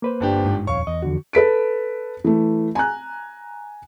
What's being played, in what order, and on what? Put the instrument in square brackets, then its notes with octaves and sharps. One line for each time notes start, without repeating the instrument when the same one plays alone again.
[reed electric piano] A#3 B4 C5
[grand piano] G1 D4 G4
[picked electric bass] G#2
[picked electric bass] D#1 F2 [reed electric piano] C#5 F5 [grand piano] C#6
[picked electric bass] E2 [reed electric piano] D#5
[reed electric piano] F2 D3 F#4
[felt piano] A4 B4 B6 D7
E3 A3
G#5 A#5 F#6